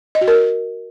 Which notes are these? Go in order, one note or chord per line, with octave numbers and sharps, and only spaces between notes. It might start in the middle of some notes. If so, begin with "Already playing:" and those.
D#5
F#4
A#4